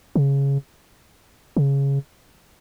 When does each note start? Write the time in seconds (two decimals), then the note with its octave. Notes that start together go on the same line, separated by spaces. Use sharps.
0.16 C#3
1.57 C#3